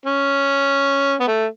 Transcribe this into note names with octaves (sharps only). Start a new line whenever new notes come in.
C#4
B3
A3